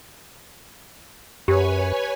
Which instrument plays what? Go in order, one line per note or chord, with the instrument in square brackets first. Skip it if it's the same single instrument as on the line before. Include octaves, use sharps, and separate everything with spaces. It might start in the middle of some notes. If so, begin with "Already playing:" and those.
[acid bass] F#2 [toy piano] G4 [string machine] B4 C#5 G#5